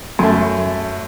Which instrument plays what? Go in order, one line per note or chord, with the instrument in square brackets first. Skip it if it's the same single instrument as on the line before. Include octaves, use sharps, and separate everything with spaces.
[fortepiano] F#2 A3